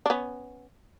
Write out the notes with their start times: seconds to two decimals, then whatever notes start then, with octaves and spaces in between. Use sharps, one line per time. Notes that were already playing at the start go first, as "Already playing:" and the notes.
0.06 D4
0.10 B3 C#4